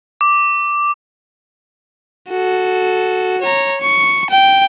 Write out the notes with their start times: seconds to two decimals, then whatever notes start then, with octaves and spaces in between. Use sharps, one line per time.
0.21 D6
2.30 F#4 A4
3.41 C#5 A#5
3.81 C#6
4.30 G5